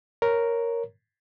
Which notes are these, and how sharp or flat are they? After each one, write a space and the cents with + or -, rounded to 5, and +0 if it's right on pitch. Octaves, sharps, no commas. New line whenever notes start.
A#4 +0 C#5 +0